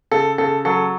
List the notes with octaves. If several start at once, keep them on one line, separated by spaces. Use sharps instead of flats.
C#3 A4
C#3 A4
F#3 A4